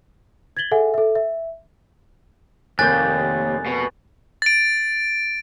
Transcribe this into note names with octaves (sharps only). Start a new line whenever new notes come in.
G#6 A6 B6 F#7 G7
G#4 A4 E5 F#5 G#5
A4 E5
E5
F1 D#2 A#3 G#5 F#6 G6 A6
B2
A6 D7